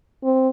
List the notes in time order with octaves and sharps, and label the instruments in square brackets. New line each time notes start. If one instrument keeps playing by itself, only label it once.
[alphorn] C4